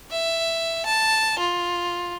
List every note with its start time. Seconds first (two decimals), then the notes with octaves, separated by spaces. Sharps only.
0.11 E5
0.85 A5
1.39 F4